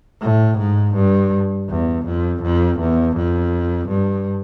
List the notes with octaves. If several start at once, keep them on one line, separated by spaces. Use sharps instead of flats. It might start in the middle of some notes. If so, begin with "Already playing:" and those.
A2
G#2
G2
E2
F2
F2
E2
F2
G2